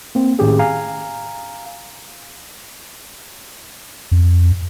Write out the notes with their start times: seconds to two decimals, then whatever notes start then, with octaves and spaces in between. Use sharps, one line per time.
0.15 A#3 C4
0.39 A2 D#3 C#4 G4 G#4
0.59 F5 G#5 A#5
4.12 F2